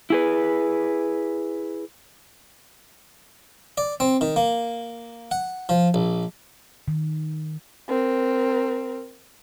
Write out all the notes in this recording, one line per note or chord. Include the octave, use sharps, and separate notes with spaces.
E4 G#4 B4
D5
C4
D#3
A#3
F#5
F3
A#1
D#3
C4 A#4